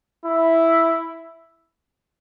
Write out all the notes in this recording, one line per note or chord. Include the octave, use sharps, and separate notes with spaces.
E4